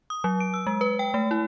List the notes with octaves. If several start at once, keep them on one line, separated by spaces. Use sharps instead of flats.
D#6
F#3
D7
E6
G#3
B4
G5
A3
E4